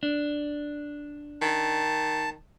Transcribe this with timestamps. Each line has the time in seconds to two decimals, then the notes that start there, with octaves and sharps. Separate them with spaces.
0.03 D4
1.42 D#3 A5